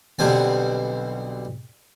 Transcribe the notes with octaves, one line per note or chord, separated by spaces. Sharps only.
B1 B2 D3 G3 C4 G#5